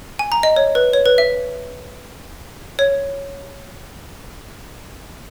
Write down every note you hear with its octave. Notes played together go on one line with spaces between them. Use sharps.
G#5
A#5
D#5
C#5
B4
C#5
B4
E5
C#5